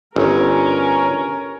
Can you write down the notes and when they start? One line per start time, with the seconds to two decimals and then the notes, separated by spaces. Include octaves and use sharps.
0.16 G1 C#4 A#4